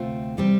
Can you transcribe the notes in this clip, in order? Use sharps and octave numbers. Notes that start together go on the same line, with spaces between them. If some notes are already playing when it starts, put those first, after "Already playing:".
Already playing: D2 C3 A3 C4 F4
C3 G3 C4